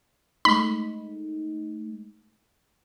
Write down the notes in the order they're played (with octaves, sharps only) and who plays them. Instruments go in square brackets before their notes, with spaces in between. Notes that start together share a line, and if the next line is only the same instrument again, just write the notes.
[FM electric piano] G#3 A3 D#4 [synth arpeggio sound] B5